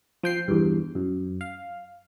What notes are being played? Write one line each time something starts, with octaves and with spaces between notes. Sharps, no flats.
F3 G5 C7
E2 G2
F#2
F5